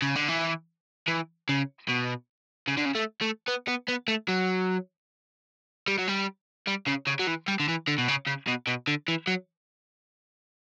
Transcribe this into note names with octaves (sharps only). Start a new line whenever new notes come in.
C#3
D3
E3
E3
C#3
B2
C#3
D3
C#3
A3
A3
B3
B3
B3
A3
F#3
G3
F#3
G3
G3
C#3
C#3
F#3
E3
G3
D3
E3
D3
B2
C#3
C#3
B2
B2
D3
E3
F#3